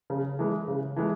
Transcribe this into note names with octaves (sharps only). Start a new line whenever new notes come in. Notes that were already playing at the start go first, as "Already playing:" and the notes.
C#3
E3 G#3
C#3
E3 G#3